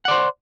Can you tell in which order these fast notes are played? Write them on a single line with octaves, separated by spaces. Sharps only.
F#5 D5 C5